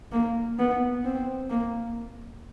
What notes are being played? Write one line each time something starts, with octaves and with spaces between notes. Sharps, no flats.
A#3
B3
C4
A#3